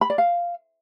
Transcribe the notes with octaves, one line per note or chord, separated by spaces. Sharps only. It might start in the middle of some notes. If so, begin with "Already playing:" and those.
B5
D5
F5